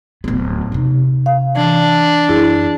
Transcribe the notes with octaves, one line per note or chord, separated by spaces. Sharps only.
D1 B3
C3 D#4
F5
E3 D4
F#2 E4 G#4